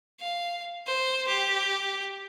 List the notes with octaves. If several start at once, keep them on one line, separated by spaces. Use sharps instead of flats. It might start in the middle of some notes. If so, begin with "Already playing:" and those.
F5
C5
G4